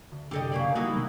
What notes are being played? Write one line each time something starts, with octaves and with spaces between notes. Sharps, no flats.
D2
C2 F#2 D3 G4 A4 D#5
C#3 A#3 D5
F#3 G3 A#3 D#4 E4 F#4
B2 D#3